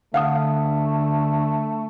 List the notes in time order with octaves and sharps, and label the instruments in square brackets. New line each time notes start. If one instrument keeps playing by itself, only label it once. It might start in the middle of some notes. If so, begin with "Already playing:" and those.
[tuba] D3 [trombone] A3 [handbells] F5 F#5 D#6